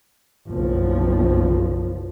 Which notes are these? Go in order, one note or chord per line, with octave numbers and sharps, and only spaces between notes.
F#1 B1 F3